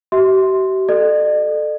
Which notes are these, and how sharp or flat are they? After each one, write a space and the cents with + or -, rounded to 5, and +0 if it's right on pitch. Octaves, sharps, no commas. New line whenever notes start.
G4 -45 E5 -30
A4 +0 D5 +45